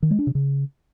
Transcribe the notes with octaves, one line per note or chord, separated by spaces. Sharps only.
D#3
G#3
D4
C3
C#3